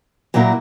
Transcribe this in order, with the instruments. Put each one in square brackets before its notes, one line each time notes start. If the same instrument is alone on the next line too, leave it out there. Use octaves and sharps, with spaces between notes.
[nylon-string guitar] A#2 F#3 A#3 E4 A#4